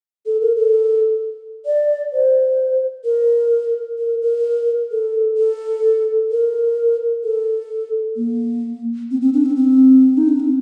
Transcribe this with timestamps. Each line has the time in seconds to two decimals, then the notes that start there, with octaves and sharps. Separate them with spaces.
0.26 A4
0.41 A#4
0.57 A4
1.66 D5
2.13 C5
3.05 A#4
3.99 A#4
4.22 A#4
4.92 A4
5.38 A4
6.31 A#4
7.24 A4
8.17 A#3
9.11 C4
9.21 C4
9.34 D4
9.45 C4
9.56 C4
10.18 D#4
10.29 D4
10.40 C4